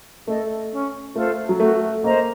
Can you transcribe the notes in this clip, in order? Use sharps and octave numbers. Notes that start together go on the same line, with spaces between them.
A3 A4 D#5
C#4
A3 F4 A4 C5
F#3
A3 F#4
A#3 C5 D#5 A#5